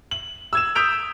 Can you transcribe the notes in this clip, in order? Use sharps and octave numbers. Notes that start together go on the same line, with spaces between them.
F#7
E6 G#6 E7
D#6 E6 G6 B6 D7 F7